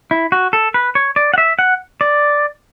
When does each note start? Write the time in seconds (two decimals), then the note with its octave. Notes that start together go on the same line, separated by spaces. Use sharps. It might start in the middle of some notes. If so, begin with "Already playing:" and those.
0.11 E4
0.32 F#4
0.53 A4
0.74 B4
0.95 C#5
1.16 D5
1.34 F#5
1.38 E5
1.59 F#5
2.01 D5